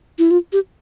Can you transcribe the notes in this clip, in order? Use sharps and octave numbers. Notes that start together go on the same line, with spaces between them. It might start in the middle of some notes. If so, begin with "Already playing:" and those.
E4
F4
G4